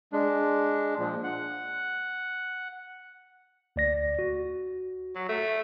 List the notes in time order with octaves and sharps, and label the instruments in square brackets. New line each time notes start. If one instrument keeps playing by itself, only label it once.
[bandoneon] G#3 D4
A#2 F3
F#5
[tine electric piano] D2 D5 A#6
F#4
[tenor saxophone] F#3
A3